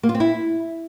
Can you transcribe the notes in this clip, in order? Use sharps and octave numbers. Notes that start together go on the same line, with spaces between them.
A#3
F4
C4
E4